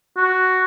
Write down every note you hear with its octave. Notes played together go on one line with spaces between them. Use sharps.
F#4